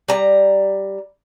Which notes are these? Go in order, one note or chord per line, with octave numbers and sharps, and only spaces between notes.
G3 A#5